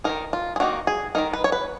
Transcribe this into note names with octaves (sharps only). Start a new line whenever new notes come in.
D#3 A#3 D#4 A#4
F4
G#4
D#3 A#3 D#4 F#4
G#4
D#3 A#3 D#4 A#4
B4
C#5
B4